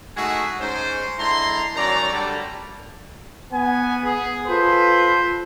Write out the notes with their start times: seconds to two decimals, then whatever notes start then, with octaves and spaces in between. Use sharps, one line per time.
0.16 G#3 A3 D#4 F#4 G#4 E5
0.60 G#2 C#4 C5
1.19 D3 G#3 E4 A#5 C6
1.75 D#3 F#3 C#4 D5 A#5
2.12 D3 G3 A3
3.53 B3 G#5
4.04 G#4
4.48 F4 A4 B4 C5